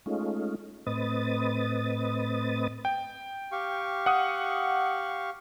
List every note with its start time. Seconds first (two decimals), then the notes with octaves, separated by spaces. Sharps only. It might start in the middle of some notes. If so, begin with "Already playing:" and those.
0.06 G#3 A3 C#4 D#4 F4
0.86 A2 C4 B4 D#5 D#6 A6
2.85 G5
3.52 G4 F5 C#6
4.06 F#5 D#6